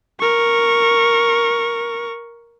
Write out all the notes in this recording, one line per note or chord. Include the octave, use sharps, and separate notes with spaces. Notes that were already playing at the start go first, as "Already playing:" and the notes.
A#4 C#6